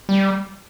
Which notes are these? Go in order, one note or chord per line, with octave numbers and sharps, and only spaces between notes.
G3